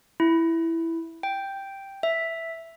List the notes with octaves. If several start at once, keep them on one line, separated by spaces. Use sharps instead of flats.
E4
G5
E5